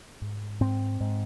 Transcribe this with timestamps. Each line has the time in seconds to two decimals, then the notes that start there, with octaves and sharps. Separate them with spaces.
0.22 G#2
0.60 G#2 C4
1.00 G#2